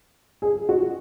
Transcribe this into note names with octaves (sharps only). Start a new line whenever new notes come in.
G#4
F#4